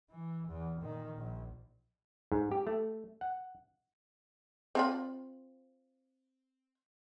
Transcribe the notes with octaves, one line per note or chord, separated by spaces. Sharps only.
E3
E2
A#2 D#3
A#1
G#2
G4
A3
F#5
C4 F4 B5